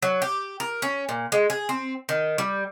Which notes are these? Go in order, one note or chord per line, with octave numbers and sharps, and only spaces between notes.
F#3
G4
A#4
C#4
A#2
G#3
G#4
C4
D#3
G3